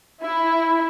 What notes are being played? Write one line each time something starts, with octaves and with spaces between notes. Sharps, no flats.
E4